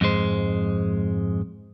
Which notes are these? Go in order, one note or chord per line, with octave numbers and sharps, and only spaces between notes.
F2 G#2 G#3 C5